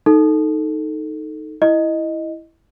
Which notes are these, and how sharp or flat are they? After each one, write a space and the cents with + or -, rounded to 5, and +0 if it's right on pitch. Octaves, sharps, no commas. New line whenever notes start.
D#4 +0 A4 +0
E4 +0 D#5 +0